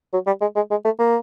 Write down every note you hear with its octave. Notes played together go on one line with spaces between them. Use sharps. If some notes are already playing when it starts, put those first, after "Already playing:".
F#3
G3
G#3
G#3
G#3
A3
A#3